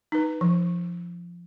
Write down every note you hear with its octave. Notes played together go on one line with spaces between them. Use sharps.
D#4 B4
F3